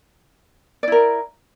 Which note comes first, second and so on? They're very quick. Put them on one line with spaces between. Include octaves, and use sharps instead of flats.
D5 E4 A#4